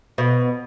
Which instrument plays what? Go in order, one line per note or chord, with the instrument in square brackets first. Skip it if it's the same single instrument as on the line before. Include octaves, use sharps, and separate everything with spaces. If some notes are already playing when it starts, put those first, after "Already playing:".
[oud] B2